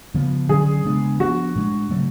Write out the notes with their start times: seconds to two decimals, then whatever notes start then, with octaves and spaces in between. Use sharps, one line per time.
0.14 C#3 F3 B3
0.49 D3 F#3 C#4 G#4
0.85 C#3 G#3 B3 D4
1.20 F3 B3 D4 F#4
1.55 A2 G#3 D4
1.91 C#3 F#3 A3